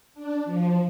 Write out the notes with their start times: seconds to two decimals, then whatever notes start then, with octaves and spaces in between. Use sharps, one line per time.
0.14 D4
0.45 F3